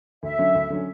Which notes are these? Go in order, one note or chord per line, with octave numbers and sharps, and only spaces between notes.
D2 E5
D3 F#3 C#4
D2
D3 F#3 C#4